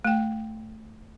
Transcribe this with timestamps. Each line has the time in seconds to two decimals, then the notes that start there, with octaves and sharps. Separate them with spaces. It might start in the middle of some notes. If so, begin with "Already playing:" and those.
0.05 A3 G5